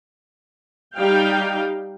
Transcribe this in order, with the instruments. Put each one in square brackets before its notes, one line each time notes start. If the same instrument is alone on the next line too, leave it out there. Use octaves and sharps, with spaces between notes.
[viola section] G3 D#4 G4 F5 G5